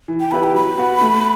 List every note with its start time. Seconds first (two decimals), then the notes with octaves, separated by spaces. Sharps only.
0.08 E3
0.20 G5
0.31 B3 E4 G4 B4 B5
0.43 G5
0.54 F#3 B5
0.78 B3 F#4
1.01 A3